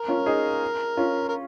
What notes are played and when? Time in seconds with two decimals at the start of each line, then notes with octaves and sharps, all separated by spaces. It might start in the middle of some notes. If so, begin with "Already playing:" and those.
Already playing: A#4
0.08 C#4 F4
0.26 D#4 G#4
0.97 C#4 F4
1.29 A#4